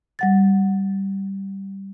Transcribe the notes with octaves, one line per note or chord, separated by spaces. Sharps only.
G3 F#5 A6